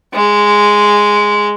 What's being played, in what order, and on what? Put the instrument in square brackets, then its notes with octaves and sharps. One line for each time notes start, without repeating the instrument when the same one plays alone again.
[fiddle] G#3